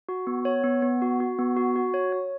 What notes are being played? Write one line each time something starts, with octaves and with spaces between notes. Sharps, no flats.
F#4
B3
C#5
B3
B3
F#4
F#4
B3
F#4
F#4
C#5
C#5